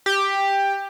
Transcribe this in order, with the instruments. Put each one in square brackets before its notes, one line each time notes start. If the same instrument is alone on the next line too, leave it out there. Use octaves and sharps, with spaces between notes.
[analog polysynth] G4